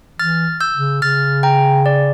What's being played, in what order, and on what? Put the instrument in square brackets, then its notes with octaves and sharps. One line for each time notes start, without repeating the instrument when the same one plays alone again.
[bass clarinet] E3 [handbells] F6 A6
[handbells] E6 G6
[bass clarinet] C#3
[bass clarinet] C#3 [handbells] F6 A6
[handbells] G5 A#5
D5